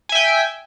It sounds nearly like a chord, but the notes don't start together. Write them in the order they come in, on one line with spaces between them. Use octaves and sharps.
G#5 E5 G5